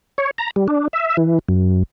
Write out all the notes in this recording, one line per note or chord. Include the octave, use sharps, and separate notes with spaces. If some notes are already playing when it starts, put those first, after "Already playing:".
C#5
A#5
G3
D4
E5
E3
F#2